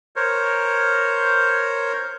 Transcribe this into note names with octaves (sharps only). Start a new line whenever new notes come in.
A#4 C5 C#5